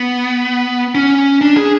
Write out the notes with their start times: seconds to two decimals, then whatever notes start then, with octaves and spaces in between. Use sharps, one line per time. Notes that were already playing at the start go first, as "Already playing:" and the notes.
Already playing: B3
0.95 C#4
1.41 D4
1.57 G#4